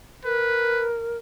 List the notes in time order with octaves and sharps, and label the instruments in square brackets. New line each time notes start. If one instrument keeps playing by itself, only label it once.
[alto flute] A#4 [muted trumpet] B4